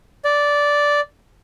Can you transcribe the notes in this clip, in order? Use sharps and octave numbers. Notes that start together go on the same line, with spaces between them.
D5